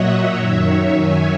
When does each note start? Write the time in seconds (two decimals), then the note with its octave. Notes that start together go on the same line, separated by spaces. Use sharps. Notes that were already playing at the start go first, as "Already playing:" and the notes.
Already playing: A#2 F#3 C#5 D#5 E5 F#5
0.32 F#2 D#3 F#3
0.94 E5 G#5